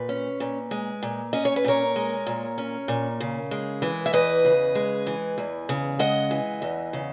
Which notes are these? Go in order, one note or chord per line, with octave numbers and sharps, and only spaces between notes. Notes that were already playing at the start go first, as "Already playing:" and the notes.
Already playing: A#2 B4
C#4
A#2
G#3
A#2
C#4 D#5
C#5
B4
A#2 A#4 C#5
G#3
A#2
C#4
A#2
C#3
G#3
E3
E5
E2 B4 D#5
C#3
G#3
E3
E2
C#3
G#3 D#5 F#5
E3
E2
C#3